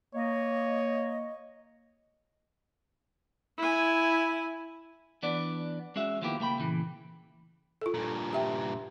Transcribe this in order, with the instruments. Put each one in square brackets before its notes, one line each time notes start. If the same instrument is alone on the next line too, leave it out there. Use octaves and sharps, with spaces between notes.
[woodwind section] A#3 D#5 [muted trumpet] C#5
[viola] E4 G#5
[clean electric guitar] E3 B3 D4 D5
G#3 C#4 F#4 E5
D#3 F3 A#3 B3 E4 G4
C#2 A3 A#3 G5 B5
A#2 C#3 E3
[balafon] F4 A4
[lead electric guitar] G2 A#2
[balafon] G4 E5 G5